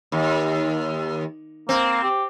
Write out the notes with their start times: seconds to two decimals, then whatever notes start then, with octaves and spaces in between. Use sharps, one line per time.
0.12 D#2
1.69 A#3 C4
2.03 G4